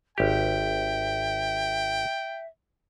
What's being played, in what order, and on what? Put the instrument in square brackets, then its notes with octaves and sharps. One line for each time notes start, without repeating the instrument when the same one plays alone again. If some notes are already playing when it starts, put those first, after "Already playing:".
[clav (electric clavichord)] G#1 G4 [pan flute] E5 [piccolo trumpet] G5